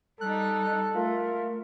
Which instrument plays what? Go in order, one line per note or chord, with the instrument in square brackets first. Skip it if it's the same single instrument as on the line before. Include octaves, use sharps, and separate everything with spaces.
[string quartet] G3 D#4 [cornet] A4 [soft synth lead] F#6
[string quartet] A3 [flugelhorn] F4 [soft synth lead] A#4